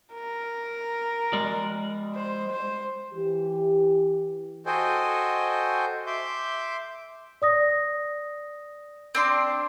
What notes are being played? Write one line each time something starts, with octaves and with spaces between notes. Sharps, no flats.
A#4
G#3 D5
C5
C5
E3 G4
F#4 A4 C5 D#5 G5 G#5
E5 C6 D6 G6
D5 D#6 A#6
C4 D4 C6